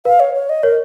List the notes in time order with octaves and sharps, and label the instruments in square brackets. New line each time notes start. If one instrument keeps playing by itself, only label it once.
[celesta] B4 [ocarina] F5
[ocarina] C#5
C#5
D#5
[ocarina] A#4 [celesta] C#5